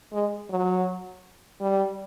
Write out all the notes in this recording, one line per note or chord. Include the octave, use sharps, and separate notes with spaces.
G#3
F#3
G3